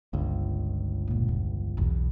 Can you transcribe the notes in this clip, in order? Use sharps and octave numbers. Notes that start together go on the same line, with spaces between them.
G1 C#2
E1 A#2
E2
B1 E2